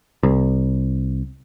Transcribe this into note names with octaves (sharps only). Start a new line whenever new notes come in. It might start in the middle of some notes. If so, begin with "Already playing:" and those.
C2